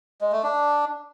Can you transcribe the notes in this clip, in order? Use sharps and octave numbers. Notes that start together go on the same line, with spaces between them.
G#3
A3
D4